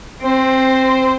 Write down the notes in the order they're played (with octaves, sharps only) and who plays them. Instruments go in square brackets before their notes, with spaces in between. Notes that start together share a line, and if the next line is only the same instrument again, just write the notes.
[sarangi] C4 [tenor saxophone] C5